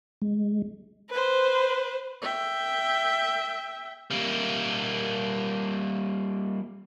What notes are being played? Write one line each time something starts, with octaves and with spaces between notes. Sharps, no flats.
G#3
B4 C5
E5 G5
G3 A#3